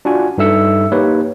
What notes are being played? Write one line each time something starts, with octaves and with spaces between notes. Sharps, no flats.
D4 F4 F#4 G#5
G2 D#4 A4 E5 E6 C#7
A#3 D#4 G4 B4 C#5